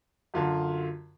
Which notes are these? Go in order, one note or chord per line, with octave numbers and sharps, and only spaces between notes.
F#2 D3 F#3 F4